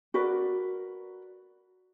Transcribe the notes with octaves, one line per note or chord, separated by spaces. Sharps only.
F#4 A#4 B4 D5